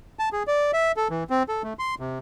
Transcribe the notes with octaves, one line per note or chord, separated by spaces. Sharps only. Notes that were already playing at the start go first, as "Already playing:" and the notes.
A5
G#4
D5
E5
A4
E3
C4
A4
A3
C6
C3